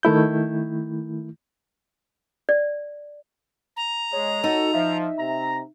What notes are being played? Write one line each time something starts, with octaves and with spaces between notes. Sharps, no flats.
D#3 A3 E4 G6
D5
A#5
G#3 C#5
D#4 F#4 A4
F3 E5
C3 A#5